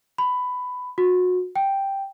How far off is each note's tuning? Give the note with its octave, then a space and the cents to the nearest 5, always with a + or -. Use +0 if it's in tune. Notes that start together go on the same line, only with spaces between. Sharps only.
B5 +15
F#4 -30
G5 +0